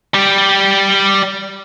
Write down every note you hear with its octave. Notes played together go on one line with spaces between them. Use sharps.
G3 G4